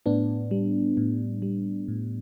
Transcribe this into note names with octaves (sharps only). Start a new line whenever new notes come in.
A2 B3 D4
G3
A2
G3
A2